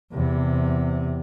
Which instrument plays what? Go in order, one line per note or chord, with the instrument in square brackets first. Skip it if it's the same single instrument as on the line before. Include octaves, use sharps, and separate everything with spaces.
[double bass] E2 C3